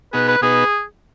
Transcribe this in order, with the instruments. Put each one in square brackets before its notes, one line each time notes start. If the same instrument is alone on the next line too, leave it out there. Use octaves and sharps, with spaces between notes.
[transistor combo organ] B2 B3 D#4 G#4 [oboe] B4
[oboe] B4
[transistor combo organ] B2 B3 D#4 B4 [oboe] G#4